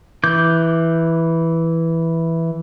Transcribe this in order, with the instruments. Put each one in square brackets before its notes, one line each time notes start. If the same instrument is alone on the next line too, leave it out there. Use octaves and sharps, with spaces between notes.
[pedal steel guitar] E3 D6 G6